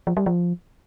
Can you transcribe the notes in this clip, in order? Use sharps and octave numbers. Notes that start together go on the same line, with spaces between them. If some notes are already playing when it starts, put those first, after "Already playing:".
F3
G3
F3